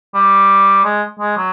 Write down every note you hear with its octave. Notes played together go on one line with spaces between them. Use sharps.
G3
G#3
G#3
F#3